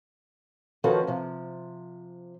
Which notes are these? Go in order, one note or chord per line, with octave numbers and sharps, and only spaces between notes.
D#3 F3 C#4 F#4 A4 B4
C3 F3